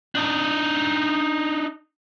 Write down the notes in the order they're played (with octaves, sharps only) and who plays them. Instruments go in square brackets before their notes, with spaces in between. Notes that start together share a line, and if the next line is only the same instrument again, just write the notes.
[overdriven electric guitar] D4 D#4